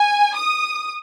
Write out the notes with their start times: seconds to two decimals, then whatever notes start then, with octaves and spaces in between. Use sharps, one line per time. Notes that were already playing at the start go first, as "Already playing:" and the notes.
Already playing: G#5
0.35 D#6